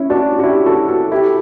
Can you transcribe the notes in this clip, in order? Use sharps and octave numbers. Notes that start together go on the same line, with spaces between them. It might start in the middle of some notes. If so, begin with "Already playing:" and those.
Already playing: C#4 E4
D4 F#4
F#4
E4 G4
F#4 A4
F#4 A4
E4 G4